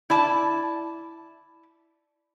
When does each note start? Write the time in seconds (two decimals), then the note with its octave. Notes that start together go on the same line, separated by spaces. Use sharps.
0.10 E4 D5 A5